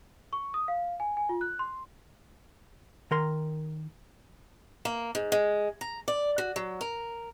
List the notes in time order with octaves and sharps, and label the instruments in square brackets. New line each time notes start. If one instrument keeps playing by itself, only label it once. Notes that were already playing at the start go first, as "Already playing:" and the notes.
[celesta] C#6
D#6
F5
G#5
G#5
F4
F#6
C6
[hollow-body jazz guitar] D#3 A#4 C6
[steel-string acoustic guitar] A#3
G#2
G#3
A#5
D5
F#4
F#3
A#4